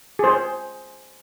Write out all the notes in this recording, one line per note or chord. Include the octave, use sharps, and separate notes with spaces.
G#4 C5